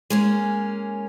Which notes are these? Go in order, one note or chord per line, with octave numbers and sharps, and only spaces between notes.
G#3 A#3 C#4